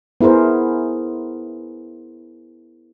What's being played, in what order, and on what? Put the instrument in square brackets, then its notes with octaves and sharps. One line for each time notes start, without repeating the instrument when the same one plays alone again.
[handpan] B3 E4 G#4 A#4 C5